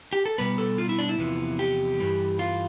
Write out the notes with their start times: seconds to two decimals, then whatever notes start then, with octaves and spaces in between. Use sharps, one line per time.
0.13 G4
0.25 A4
0.38 B2 G3 B3 B4
0.58 A4
0.78 F4
0.89 E4
0.99 D4
1.09 E4
1.18 E2 C3 F3 B3
1.59 G4
1.99 G2 E3 G3
2.39 F4